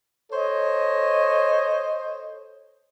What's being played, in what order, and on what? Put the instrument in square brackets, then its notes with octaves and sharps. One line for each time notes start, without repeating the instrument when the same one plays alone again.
[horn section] A4 C5 C#5 D#5